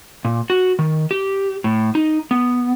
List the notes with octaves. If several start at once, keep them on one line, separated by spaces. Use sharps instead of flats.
A#2
F#4
D#3
G4
A2
D#4
B3